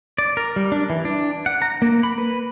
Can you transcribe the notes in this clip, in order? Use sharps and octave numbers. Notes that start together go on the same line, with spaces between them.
D5
A#4
G3
D4
E3
D4
F#5
A#5
A#3
B5
B4